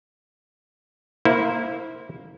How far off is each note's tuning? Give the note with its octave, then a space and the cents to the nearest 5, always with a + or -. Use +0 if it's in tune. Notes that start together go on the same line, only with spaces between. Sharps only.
A#3 +0 E4 -20 C5 +0